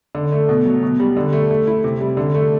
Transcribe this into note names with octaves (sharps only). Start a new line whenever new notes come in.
D3
A3
B2
F#3
B2
G3
D3
A3
A3
E4
C3
G3
D3
A3